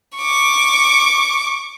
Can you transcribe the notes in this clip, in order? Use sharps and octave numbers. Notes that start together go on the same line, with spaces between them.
C#6 D6